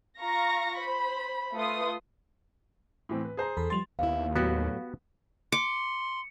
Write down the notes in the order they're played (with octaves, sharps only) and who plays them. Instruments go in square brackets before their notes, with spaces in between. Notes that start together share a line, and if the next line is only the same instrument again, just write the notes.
[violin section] F4 F5 A#5 C#6 A#6
C5 B5
A3 F4 B4 C6 D#6
[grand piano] A2 E3 C4
B4
G#4 C5 A#5
[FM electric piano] E2 A4 B5
[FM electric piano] F3 G3 A6 [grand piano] C6 F7
[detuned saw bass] D#2 [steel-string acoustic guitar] B3 E4 [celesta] F5
[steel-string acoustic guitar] A2 F#3 [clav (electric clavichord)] B3 F#4 G4
[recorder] C6 [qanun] D6 [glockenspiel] C#7